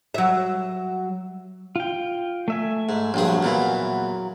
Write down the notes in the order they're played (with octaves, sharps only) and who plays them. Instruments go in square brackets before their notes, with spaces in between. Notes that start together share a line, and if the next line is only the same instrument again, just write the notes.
[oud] F#3 E5
[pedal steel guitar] F4 G5
A3 E5 G#5
[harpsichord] G#2
[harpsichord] A#1 G2 G#4 [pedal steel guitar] F#3
[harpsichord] E2 A#2 E3